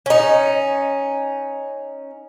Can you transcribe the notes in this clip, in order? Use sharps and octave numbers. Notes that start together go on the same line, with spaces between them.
C#4 D#4